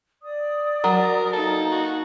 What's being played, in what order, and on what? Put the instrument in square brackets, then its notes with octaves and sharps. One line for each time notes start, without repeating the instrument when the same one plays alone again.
[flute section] D5 D#6
[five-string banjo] F#3 [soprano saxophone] A#4
[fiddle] A#3 D#4 [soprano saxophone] A4
[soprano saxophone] F#4